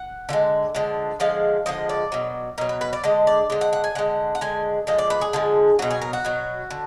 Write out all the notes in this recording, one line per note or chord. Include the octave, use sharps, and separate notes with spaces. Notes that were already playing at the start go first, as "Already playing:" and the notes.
Already playing: F#5
D3 F3 G#3
D3 F3 G#3
D3 F3 G#3 F5
D3 F3 G#3 D#5
D5
B2 F#3
B2 F#3 A#4
B4
B4
D5
D3 G#3 D#5
D5
D3 G#3 D#5
F#5
F#5
G#5
D3 G#3 F#5
F#5
D3 G#3 G#5
D3 F3 G#3 D#5
D5
B4
G#4
D3 F3 G#3
B2 F#3 F#4
G#4
A#4
F#4
B2 F#3
D3